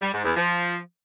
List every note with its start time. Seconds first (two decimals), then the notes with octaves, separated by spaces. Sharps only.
0.02 G3
0.13 G#2
0.24 E2
0.35 F3